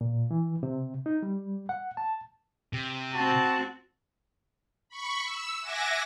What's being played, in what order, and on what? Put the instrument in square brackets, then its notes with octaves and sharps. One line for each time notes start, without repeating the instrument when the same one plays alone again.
[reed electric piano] A#2
E3
C3
D#4
G3
F#5
A5
[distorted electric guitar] C3
[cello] C4 F#4 [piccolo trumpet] A5
[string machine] B5 C#6
E6
E5 F#5 G#5 D6 A#6